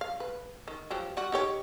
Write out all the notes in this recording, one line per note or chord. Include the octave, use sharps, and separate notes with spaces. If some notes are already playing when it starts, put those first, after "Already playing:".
F5
B4
D#3
F3 F#3 G4
G3 F#4
D#4 G4 C#5